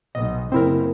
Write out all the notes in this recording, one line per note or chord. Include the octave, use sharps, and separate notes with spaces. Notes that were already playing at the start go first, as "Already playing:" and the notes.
B1 D#5
F#1 C#3 C4 E4 A#4